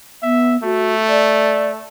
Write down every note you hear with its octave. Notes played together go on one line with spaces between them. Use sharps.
B3 E5
A3 F#4
D5